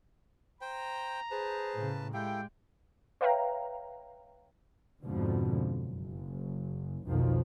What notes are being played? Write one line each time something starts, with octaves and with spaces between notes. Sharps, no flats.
C5 G5 A#5
G#4 B4 C5 A5
A2 C#3
G#3 E4 G4 A4 F5 G5
B4 C#5 E5 F5 G5 A#5
F2 G#2 B2 D3 F3
F#1
B1 F2 B2 D#3 F3